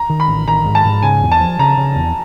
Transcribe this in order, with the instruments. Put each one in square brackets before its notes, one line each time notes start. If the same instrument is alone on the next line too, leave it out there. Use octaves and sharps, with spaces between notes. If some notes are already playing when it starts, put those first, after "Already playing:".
Already playing: [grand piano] A#5
[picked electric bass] D#3
[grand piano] B5
[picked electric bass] A1
[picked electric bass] D#3 [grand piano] A#5
[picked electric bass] G#2
[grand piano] A5
[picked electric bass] G#2
[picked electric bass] C#3 [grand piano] G#5
[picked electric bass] E2
[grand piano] A5
[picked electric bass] F3
[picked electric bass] C#3 [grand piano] A#5
[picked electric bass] C#3
E2